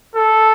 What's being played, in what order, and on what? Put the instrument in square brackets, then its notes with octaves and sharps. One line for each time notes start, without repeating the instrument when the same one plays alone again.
[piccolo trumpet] A4